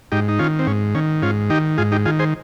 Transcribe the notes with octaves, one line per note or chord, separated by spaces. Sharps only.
G#2 D#4 G4
D#4
D#3 C#4 F4
C4
G#2 C#4
D#3 C#4
G#2 C#4 F4
D#3 D#4 G4
G#2 F4 G#4
D#4 G4
D#3 F4 G#4
G#4 C5